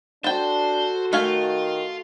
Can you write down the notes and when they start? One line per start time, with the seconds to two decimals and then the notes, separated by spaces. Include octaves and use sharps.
0.24 D4 F#4 A4 C5 G5 A5
1.13 D#3 A3 F4 F5 G#5